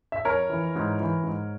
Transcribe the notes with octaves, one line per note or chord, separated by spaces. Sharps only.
E5
F2 A#4 C#5
E3
G#2
E3
G#2